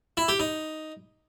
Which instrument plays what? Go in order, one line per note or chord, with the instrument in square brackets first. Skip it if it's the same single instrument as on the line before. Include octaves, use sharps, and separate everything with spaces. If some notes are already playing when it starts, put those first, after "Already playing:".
[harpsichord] E4
G4
D#4